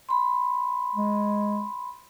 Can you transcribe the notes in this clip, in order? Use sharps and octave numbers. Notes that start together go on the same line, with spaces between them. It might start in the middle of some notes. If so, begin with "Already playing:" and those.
B5 C6
G#3